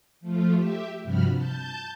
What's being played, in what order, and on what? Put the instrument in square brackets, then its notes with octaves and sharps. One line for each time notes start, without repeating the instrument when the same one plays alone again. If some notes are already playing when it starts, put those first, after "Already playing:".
[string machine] F3 A3 F4
G4 E5
G2 C3 F3 F#4 B5 F6
A5 G6